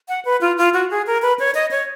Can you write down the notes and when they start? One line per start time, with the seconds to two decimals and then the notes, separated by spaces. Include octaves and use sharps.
0.09 F#5
0.25 B4
0.41 F4
0.58 F4
0.74 F#4
0.91 G#4
1.07 A#4
1.22 B4
1.39 C#5
1.55 D#5
1.71 C#5